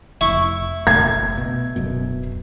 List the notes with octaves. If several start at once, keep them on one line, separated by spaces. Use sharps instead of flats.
F1 E4 C#6
F#1 B1 A3 G#6
B2
D1 F#2 B2